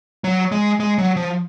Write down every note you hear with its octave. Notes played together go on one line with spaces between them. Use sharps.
F#3
G#3
G#3
F#3
F3